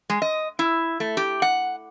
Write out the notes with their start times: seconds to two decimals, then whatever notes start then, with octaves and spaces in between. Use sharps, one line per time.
0.10 G#3
0.22 D#5
0.59 E4
1.00 A3
1.17 G4
1.42 F#5